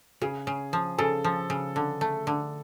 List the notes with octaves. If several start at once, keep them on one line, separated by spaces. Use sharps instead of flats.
C#3 G#4
C#3
F3
C#3 A4
F3
C#3
D3
A3
D3